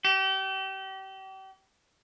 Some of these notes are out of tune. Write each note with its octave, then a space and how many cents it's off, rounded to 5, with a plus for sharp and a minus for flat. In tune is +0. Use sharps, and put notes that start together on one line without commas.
G4 -35